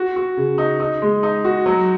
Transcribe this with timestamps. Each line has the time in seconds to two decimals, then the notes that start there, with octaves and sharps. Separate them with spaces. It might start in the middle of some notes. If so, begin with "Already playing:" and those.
Already playing: F#4
0.16 F#4
0.37 C#3
0.58 D#4
0.80 D#4
1.02 G#3
1.23 D#4
1.44 F#4
1.66 F#3